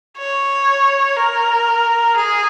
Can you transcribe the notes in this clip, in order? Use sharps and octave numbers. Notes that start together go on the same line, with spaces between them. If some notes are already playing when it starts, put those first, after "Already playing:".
C#5
A#4
G#4